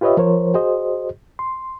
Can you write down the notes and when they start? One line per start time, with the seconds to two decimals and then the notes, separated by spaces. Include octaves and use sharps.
0.01 F4 G4 B4 C#5 D#5 E5
0.17 F3 A#4 C5 C#5
0.54 F#4 G#4 C5 D#5
1.39 C6